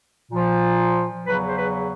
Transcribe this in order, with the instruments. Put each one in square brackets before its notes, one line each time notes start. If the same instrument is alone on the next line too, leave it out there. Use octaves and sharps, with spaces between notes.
[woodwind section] A#2 F3
E2 C#3 F#3 B4
C5
B4